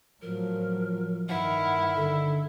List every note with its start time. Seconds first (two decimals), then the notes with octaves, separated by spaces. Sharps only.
0.22 A2 F3 F#3 A#4
1.29 G2 D#3 E4 F#5 F6
1.96 D3 A4